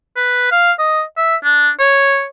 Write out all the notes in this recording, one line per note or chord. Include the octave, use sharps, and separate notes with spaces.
B4
F5
D#5
E5
D4
C#5